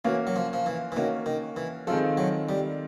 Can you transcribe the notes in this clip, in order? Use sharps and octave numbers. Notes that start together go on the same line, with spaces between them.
E3 A#3 C#4 F#4
F#3
F3
F3
E3
E3
D#3 A#3 C#4 F#4
D#3
E3
D#3 F3 G#3 C4 F4 A4
F#3
G3